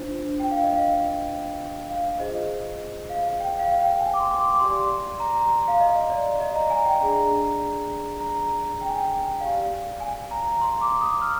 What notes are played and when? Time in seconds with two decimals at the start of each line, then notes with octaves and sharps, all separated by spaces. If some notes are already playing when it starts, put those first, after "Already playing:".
Already playing: D4 F4 C5
0.40 G5
0.51 F5
0.63 D#5
0.76 F5
1.90 F5
2.19 F4 G#4 C5 D#5
3.09 F5
3.40 G5
3.59 F5
3.72 F5
3.80 G5
4.00 G#5
4.14 D6
4.20 C6
4.40 D6
4.54 D6
4.59 G4 D5 C6
5.20 A#5
5.68 F5
5.80 D#5
6.10 D5
6.40 D#5
6.56 A#5
6.70 G#5
6.85 G5
7.00 D4 G#4 D5 A#5
8.21 A#5
8.81 G5
8.89 G#5
8.98 G5
9.40 G4 D5 F5
10.00 G#5
10.31 A#5
10.61 C6
10.81 D6
11.01 D#6
11.21 F6